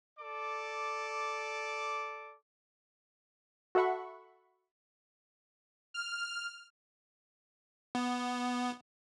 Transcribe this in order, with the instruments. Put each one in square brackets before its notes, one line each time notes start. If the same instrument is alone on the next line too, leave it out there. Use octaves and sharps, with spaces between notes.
[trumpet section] A4 D5 D6
[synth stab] F#4 A4 E5 F#5 B5 C#6
[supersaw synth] F6
[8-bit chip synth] B3